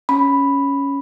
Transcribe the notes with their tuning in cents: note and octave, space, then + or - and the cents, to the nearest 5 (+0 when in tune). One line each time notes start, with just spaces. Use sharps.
C#4 +5 B5 +0